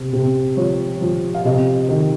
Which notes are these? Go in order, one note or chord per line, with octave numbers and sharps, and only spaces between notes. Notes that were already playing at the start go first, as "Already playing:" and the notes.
Already playing: C3
C3
F3 C#5
F3
F5
C3 D#5
D#3